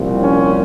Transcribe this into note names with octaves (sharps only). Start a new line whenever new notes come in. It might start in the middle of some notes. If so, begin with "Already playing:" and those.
Already playing: C2 A#2 F3 C4
C#4